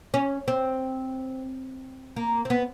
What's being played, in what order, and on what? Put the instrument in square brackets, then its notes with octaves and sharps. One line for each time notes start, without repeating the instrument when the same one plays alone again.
[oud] C#4
C4
A#3
C4
B3